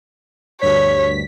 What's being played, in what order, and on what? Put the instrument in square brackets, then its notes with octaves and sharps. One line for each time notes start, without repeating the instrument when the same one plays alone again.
[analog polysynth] D2 G2 B6 [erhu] C#5